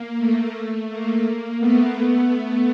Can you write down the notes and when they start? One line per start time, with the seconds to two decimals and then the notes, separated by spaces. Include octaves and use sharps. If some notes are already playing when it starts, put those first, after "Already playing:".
Already playing: A#3
0.18 A3
0.89 A#3
1.59 A3 B3
2.31 A3 B3